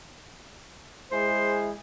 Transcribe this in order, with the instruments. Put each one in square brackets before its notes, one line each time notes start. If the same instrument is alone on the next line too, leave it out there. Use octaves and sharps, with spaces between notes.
[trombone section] G#3 E4 G#4 [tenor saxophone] C5